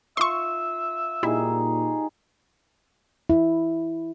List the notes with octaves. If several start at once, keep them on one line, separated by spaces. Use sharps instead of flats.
F4 E5 C6 C#6 D#6
A#2 G3 D#4 E4 G#4
E4